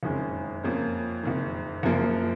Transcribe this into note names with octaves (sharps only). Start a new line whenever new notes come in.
F#1 F2 D#3 G#3 C#4
F2 F3 A#3 C#4
F#1 F2 D#3
F#1 F#2 F3 A#3